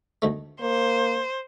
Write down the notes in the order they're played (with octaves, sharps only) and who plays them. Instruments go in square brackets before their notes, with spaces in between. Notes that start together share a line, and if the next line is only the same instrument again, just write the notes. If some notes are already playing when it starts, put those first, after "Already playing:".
[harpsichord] D2 D#3 A3
[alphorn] A#3 [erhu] C5